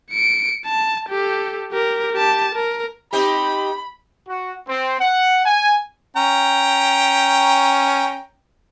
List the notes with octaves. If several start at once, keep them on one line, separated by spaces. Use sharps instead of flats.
C#7 D7
A5
G4 A4
G4 A#4
G4 A5
A#4
C4 D#4 G4 B5
F#4
C4
F#5
G#5
C#4 G5 A#5